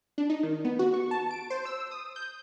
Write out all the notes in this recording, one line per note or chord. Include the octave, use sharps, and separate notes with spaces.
D4
D#4
D#3
B3
F#4
C#6
A5
D7
C5
E6
D#6
G6